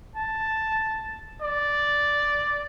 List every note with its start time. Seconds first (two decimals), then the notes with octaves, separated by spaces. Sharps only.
0.16 A5
1.42 D5